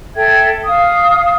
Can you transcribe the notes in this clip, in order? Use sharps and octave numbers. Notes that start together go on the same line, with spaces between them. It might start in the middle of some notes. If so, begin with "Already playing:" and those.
A4 E5 G5 G#6
F5 D#6